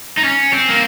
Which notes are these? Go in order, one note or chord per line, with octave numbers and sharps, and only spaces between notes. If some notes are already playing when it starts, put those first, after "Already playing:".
D#4
C#4
C4
A#3